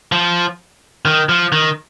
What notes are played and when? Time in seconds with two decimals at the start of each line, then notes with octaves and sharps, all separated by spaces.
0.12 F3
1.05 D#3
1.29 F3
1.52 D#3